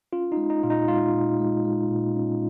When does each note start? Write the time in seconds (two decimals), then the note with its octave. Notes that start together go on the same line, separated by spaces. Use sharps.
0.13 C#4 F4
0.32 D#4
0.37 G#3
0.50 D#4
0.63 A#2 F4
0.70 D#4
0.88 G#3 F4
1.14 A#2
1.39 G#3
1.65 G#3
1.90 A#2
2.16 C#4